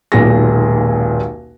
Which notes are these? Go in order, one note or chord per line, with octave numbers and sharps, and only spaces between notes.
D#1 B1 A#2 G#3 A#6